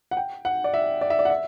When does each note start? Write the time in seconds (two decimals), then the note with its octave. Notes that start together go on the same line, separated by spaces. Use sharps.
0.11 F#5
0.17 G5
0.45 F#5
0.64 D5
0.74 E5
1.01 D5
1.10 E5
1.19 D5
1.25 F#5
1.30 E5